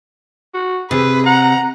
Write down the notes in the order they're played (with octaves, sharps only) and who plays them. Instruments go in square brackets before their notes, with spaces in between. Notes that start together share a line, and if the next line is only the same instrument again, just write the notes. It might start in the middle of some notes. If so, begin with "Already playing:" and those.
[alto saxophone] F#4
[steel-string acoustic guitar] C3 [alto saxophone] G#4 [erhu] B4
[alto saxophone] F#5 [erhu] A#5